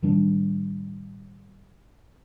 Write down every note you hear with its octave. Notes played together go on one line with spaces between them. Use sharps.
A2 D#3 G3 D4